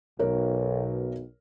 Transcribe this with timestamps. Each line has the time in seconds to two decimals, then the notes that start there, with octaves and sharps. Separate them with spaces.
0.19 B1 A#4 C#5